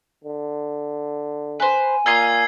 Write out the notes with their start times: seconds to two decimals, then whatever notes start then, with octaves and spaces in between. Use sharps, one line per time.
0.24 D3
1.60 B4 C5 G#5
2.06 A#2 A#3 F4 D#5 E6 G#6 C7